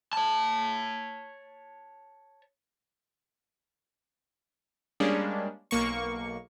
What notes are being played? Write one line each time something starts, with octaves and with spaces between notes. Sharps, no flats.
C#5 A5
G3 G#3 A#3 C#4 D4
B1 A#3 C#6